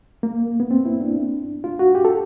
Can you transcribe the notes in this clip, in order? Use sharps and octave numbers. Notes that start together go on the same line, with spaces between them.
A#3
B3
C4
E4
D4
F4
F#4
G4
A4